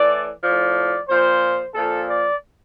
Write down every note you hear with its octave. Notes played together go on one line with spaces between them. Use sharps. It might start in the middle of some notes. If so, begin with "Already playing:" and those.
Already playing: A2 E3 D5
A2 F3 D5
A#2 F3 C5
A#2 F3 A4
D5